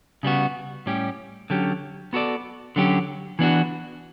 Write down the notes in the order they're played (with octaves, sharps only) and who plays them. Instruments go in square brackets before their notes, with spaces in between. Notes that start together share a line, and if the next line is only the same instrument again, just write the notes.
[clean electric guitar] C#3 G3 B3 F#4
A2 G3 C#4 G4
D3 F#3 C#4 G4
B3 F#4 A4 D5
D3 F#3 C#4 G4
E3 B3 D4 F#4